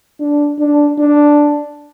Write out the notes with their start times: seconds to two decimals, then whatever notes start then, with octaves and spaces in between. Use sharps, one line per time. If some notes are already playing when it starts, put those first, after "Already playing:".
0.20 D4
0.59 D4
0.99 D4